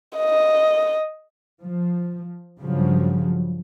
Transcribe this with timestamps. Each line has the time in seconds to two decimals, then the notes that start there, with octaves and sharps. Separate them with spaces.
0.18 D#5
1.62 F3
2.60 G2 C#3 F3 F#3